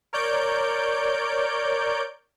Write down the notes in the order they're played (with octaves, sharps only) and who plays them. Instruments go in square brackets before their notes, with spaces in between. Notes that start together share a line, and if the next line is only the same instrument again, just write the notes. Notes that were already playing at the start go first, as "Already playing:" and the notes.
[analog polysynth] A#4 C#5 D5 G6 D7